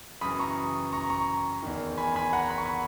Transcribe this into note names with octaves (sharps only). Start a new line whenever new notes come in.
F#2 C#3 E3 B5 D#6
A#5 C#6
A#5 C#6
A#5 C#6
E2 D#3
G#5 B5
G#5 B5
F#5 A#5
B5
C#6
B5